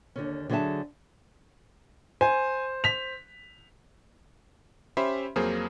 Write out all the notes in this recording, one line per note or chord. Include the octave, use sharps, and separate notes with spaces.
D#2 D3 C#4
D3 F#3 G#4 A4 E5 A5
C5 G#5
B6 F7
C#4 G4 C5 E5 B5 C6
F2 F#3 A#3 G#4 A#4 C5